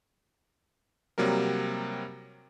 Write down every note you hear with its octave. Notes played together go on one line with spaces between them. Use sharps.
C3 F#3 G3 A#3 A#4